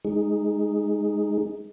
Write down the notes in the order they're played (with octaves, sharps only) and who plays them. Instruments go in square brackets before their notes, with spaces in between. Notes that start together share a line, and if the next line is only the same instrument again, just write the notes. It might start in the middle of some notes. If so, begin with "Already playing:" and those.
[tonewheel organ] G#3 D#4 G#4